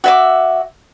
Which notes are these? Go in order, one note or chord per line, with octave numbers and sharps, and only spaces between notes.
F#4 E5 D6